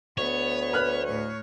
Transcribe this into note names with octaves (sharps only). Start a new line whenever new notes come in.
D2 B3 C#5
B4 F6 F#6
A2 C#5